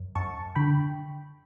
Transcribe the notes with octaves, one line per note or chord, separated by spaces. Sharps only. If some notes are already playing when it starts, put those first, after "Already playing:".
Already playing: F#2
F#2 A5 C#6
D3 G5 B5